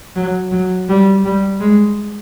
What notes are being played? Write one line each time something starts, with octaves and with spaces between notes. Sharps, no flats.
F#3
F#3
G3
G3
G#3